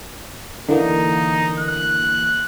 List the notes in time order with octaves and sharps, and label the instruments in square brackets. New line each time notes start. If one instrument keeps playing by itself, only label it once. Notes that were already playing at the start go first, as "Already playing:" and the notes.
[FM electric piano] D3 E3 A#3 [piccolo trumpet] D#4
[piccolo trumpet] F#6